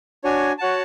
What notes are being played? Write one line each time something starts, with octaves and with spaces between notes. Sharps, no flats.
D4 F#4 C#5 G#5
F#4 C#5 F#5 A5